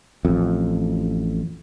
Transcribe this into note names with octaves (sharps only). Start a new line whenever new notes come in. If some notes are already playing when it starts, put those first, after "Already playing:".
A1 F2